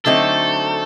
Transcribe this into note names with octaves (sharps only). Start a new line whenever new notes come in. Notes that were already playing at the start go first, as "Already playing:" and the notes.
D3 F#3 A3 C4 D#4 A4